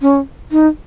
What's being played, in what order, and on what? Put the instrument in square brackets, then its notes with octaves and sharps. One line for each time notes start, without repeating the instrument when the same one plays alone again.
[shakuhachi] C#4
D#4